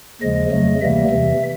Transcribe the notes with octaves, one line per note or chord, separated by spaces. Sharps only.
D#2 C#3 F3 G#3 D#5
F2 C#3 F#3 A3
D2 C3 E3 G3 A#3 E5
E2 C3 E3